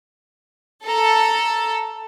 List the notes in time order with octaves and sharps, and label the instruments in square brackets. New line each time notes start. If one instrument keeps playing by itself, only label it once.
[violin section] A4 [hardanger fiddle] A#5